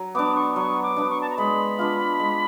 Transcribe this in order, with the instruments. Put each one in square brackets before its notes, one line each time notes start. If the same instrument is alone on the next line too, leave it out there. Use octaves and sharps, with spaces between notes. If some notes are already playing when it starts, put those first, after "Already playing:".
Already playing: [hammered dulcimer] F#3
[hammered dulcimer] B3 D4 [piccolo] D6
[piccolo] C#6
[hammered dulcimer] F#3 [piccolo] C#6
[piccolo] D6
[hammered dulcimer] B3 D4
[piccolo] C#6
A5
A#5
[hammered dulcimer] G#3 [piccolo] B5
[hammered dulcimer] B3 D4 F4
G#3